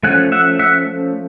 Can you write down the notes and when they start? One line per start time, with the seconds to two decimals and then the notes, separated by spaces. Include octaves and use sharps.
0.03 F3 A3 C#4 F#5 G#5
0.32 E5 F#5
0.59 E5 F#5